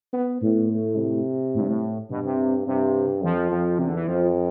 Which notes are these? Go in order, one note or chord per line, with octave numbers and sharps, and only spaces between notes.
B3
A2 B3
A3
C3
A2
G2
A2
G2 B2
C3
G2 C3
F2 F3
F2
E2 C3
D3
E3
F2 F3